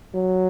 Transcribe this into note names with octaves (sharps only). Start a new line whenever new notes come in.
F#3